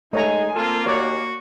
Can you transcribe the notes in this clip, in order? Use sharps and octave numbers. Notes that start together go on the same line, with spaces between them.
G#3 A3 D#4 C#5 G#5 A#5
A#3 C4 F4 A4
D#2 F#4 C#5 D5